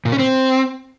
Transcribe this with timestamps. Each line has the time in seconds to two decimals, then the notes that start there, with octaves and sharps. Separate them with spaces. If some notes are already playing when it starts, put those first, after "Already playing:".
0.05 A#2
0.12 C#4
0.19 C4